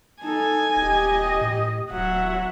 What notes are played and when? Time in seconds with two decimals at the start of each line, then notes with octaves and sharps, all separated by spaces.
0.23 D#4 A4 G#5
0.76 D#1 G4 D#5
1.41 A2
1.91 D1 F#3 E5 F#5